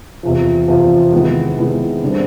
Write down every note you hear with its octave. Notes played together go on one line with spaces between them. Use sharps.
E2 C3 F3
E2 C3 F3
C3 D#3 G#3 B3 E4
C3 D#3 G#3 B3 E4
D3 G3 C4